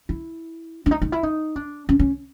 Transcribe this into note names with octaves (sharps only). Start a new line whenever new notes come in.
E4
D4
D#4
D#4
E4
D#4
D4
C#4
C#4